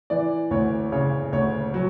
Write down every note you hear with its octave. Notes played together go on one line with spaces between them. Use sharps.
E3 D5
D2 C#5
C#3 C#5
D2 C#5
F#3